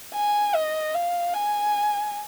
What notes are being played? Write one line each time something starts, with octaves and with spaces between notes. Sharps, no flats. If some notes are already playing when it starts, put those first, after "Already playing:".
G#5
D#5
F5
G#5